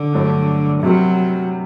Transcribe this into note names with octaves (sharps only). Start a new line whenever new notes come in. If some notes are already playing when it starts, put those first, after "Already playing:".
Already playing: D3
G2 F#3 A3 D4
C3 F#3 G3 C4 F#4 A#4